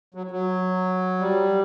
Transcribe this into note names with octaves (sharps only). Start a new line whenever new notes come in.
F#3
F#3
G3